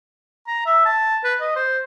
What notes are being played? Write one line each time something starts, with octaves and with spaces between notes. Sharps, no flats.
A#5
E5
A5
B4
D#5
C5